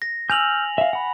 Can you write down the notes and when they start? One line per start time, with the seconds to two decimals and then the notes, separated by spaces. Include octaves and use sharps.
0.02 A#6
0.30 G#5 E6 F6 G6 F7 F#7
0.78 E5 F5
0.93 F#5 B5